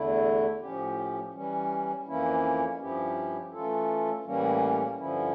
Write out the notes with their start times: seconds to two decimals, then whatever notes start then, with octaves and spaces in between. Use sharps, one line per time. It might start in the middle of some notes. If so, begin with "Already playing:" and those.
Already playing: E2 D3 A3 E4
0.61 A2 F3 C#4 G4
1.34 E3 G3 C#4
2.06 F2 E3 A#3 C#4 E4
2.79 G2 F3 C#4 E4 G4
3.52 E3 A3 C#4 F4 A4
4.24 A2 E3 G3 A#3 C#4
4.97 G2 D3 F3 C#4 E4